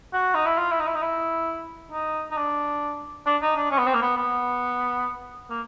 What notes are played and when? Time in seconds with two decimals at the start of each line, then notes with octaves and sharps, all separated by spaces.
0.13 F#4
0.34 D#4
0.46 E4
0.58 F4
0.72 E4
0.80 D#4
0.87 E4
0.95 D#4
1.02 E4
1.92 D#4
2.31 D#4
2.37 D4
3.26 D4
3.42 D#4
3.56 D4
3.71 C#4
3.78 B3
3.86 C4
3.94 A#3
4.02 B3
4.17 B3
5.50 A#3